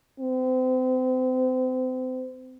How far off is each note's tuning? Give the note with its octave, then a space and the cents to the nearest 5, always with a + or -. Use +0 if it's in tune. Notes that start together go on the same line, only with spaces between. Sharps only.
C4 -35